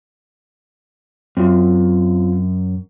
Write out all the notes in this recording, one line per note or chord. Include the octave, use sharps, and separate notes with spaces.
F#2 C4 F4